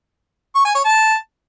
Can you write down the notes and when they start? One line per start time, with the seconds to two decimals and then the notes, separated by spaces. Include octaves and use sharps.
0.55 C#6
0.65 G#5
0.75 C#5
0.85 A5